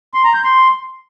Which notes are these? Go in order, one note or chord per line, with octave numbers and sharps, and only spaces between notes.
C6
A#5
G6
C6